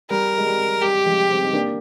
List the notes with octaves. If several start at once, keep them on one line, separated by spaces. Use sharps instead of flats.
G3 A#4
G#3
G3
G3 G4
F3 G#3
G#3 C4
D#4
A#3 D4